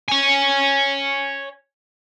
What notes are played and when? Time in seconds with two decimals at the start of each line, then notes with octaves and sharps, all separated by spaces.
0.08 C#5 G#5